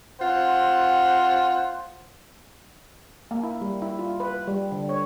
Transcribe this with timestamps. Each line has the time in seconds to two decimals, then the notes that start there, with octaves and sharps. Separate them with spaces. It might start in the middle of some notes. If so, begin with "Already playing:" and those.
0.21 C4 F4 C5 F#5
3.31 A#3
3.43 E4
3.61 G3
3.82 E4
3.99 F4
4.20 B4
4.47 G3
4.72 D3
4.89 C#5